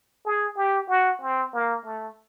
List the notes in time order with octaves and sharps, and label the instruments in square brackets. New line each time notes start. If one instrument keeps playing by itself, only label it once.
[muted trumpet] G#4
G4
F#4
C4
A#3
A3